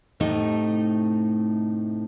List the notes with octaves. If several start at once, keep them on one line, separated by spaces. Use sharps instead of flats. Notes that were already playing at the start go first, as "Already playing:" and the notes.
A2 C3 A3 D#4